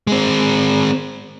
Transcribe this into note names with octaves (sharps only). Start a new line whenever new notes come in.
G#3 C4